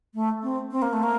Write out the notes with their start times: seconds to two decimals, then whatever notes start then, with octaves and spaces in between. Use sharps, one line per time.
0.14 A3
0.43 C4
0.71 C4
0.82 A#3
0.93 A3
1.03 A#3